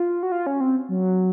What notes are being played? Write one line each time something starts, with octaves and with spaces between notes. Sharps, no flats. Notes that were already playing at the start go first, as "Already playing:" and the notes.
Already playing: F4
F#4
F4
C#4
C4
F#3